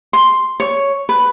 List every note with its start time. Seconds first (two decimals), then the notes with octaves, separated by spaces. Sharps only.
0.13 C6
0.60 C#5
1.09 B4